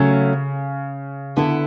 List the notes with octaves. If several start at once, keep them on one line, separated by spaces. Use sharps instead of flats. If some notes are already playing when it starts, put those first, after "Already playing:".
Already playing: C#3 F#3 A3 C#4
D3 B3 E4 A4